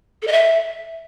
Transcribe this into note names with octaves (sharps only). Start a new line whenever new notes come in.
A4
D#5
E5